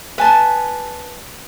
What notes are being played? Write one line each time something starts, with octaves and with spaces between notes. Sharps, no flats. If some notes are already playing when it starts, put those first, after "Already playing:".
B4 G#5 A5